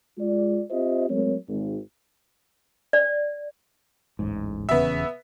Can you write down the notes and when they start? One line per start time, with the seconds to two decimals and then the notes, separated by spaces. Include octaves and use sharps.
0.18 G#3 F4 D5
0.71 C4 F4 G4 C5 D#5 E5
1.10 F#3 G#3 A3 C4 A#4 C#5
1.48 G#1
2.93 D5
4.19 D1 A1 G#2
4.69 D#1 E2 C#3 B3 E5